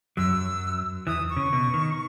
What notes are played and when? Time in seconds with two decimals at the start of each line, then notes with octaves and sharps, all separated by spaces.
0.17 F#2 F#3 E6
1.07 E2 E3 D#6
1.30 C#6
1.37 C#3
1.53 B2
1.74 D#3